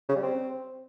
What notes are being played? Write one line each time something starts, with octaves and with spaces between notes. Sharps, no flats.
C#3
G3
C4